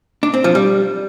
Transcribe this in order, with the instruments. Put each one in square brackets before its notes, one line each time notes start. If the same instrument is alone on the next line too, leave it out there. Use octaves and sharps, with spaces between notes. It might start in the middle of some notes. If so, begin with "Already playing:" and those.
[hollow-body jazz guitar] D4
C4
F3
G3